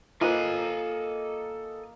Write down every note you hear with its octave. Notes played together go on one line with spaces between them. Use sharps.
A#3 F4 A4 C5 D#5 F5 G#5